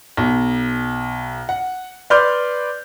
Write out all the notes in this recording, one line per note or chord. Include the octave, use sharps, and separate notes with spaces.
B1
F#5
B4 D5 C6 D6 F6 G6